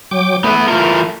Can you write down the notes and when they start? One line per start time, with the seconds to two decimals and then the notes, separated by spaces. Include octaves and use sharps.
0.11 F#3 G5 D6
0.44 A3 B3 E4 B4
0.68 E3 A3 F4 A#4